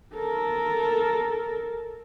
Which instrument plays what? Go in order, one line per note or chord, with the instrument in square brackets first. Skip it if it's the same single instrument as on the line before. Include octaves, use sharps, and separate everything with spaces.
[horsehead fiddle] A4 A#4